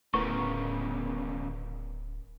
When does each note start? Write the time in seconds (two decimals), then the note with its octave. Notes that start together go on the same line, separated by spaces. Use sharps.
0.14 D1 D2 A2 C#3 B3 A#4 C#6